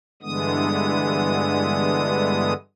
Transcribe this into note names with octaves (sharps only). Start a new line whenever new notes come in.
G2 D3 E3 G#3 B3 D#6